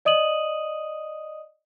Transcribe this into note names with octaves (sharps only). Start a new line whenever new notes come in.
D5 D#5 D#6 D#7 F#7